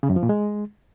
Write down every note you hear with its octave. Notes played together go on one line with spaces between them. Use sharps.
C#3
F#2
F3
A#2
G#3